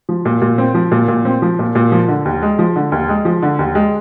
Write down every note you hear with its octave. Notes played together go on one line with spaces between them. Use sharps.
F3
A#2
A#2
C4
F3
A#2
A#2
C4
F3
A#2
A#2
F3
D3
D#2
G#3
F3
D3
D#2
G#3
F3
D3
D#2
G#3